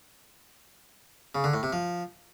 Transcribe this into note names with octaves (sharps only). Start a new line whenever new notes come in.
C#3
D3
A2
C3
F3